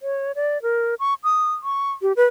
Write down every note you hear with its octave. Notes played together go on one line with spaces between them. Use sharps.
C#5
D5
A#4
C#6
D#6
C#6
G4
B4